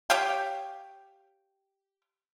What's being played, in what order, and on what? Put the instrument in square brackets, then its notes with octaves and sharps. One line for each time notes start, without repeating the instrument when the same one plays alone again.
[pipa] G4 C#5 F5 G5